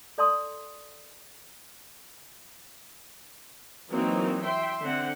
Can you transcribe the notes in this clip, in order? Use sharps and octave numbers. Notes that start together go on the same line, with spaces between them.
A4 D5 A5 C6 D#6
E3 F#3 A#3 C4 D#4
E5 G5 C6
D3 C4 F#5